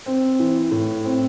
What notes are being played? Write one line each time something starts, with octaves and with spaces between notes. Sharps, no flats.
C4
E3
A2
C4